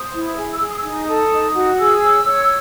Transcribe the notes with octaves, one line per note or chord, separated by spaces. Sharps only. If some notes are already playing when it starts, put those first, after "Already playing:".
Already playing: C5 D#6
E4
G#4
E6
G#4
D#6
E6
D#4 D#6
A4
D#4
F#4
G#4 E6
C#5
C#5